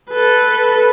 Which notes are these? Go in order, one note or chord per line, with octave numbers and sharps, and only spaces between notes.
A4 B4